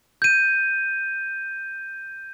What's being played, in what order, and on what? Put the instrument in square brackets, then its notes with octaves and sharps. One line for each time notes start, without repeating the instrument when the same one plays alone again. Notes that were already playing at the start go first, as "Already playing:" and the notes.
[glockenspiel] G6 D#7